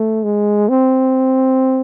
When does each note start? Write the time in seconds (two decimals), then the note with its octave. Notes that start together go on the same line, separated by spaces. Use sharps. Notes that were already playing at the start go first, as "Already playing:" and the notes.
Already playing: A3
0.23 G#3
0.69 C4